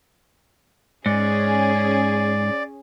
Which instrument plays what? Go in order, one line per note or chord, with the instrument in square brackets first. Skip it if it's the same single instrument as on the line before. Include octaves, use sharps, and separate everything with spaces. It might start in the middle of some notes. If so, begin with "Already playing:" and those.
[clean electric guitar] G#2 [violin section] C#4 G#4 [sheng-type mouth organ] D5